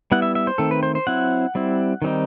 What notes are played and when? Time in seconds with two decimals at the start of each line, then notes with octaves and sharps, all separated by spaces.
0.12 G3 B3 E4 F#5
0.22 E5
0.35 E5
0.47 C5
0.58 D#3 A3 C4 A4
0.71 B4
0.83 C5
0.95 C5
1.07 F#3 C4 E4 F#5
1.55 G3 C4 E4
2.02 D#3 G3 C4 D#4